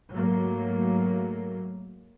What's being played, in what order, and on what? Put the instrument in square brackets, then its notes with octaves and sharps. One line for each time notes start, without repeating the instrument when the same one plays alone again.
[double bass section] G#2 F#3 A3 A#3